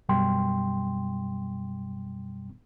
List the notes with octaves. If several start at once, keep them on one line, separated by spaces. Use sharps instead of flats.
F#2 B2 G3 G5 C6